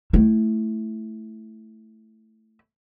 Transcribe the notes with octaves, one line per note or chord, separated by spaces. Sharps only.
A3 E4